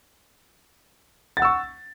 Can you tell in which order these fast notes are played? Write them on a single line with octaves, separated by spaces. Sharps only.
A6 F#5 E6 C#6